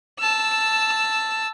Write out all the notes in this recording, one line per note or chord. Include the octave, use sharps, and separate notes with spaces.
A5 E6